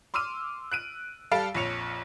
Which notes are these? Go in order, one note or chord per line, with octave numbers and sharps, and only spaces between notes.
C6 D6 E6 F6 D#7
F#6 D7 D#7
G3 A4 F5 A5 A6 D7
A#1 F2 C#5 C#7 F7